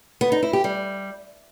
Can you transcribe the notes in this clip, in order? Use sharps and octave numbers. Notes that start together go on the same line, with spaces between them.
B3
D#4
E4
G4
G3